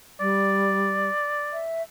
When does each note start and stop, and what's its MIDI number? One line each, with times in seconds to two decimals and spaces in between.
0.20 1.10 55
0.20 1.64 74
1.53 1.83 76